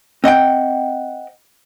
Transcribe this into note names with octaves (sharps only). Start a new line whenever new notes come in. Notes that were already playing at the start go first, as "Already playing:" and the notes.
C4 D#5 F#5 G5